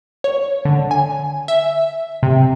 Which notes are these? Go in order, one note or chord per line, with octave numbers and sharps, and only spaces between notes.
C#5
D3
G#5
E5
C3